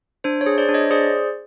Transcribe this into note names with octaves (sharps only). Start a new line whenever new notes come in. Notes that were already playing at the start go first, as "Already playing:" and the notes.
D4 C5
C#5
G#4
C5 D5
D4
C#5 D#5
G#4 C5 D5